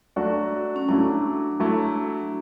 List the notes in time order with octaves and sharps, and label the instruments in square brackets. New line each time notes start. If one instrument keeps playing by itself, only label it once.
[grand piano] F#3 A3 D4 F#4
[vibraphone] C#4
[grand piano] F#3 A3 E4 [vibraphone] D4
[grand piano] F#3 A3 E4